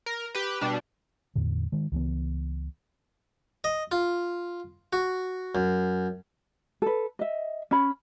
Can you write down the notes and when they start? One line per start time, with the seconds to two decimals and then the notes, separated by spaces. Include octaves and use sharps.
0.06 A#4
0.35 G4 B4
0.61 B2 G3 D4
1.36 E2 A2 D3
1.72 D#3 G#3
1.92 C#2 E3 B3
3.64 D#5
3.92 F4
4.93 F#4
5.55 F#2
6.82 A4 B4
7.19 D#5 E5
7.71 C#4 C#5 B5